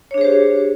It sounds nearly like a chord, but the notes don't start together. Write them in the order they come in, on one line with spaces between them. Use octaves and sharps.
C#5 D4 G#4 C5 G4